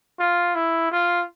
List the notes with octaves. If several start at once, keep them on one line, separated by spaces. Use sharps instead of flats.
F4
E4
F4